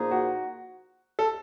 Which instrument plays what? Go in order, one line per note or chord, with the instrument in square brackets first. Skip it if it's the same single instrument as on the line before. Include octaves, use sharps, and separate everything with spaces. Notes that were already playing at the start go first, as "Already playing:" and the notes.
Already playing: [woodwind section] A#2 F3 A#3 D#4 G#4
[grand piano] F#4
A4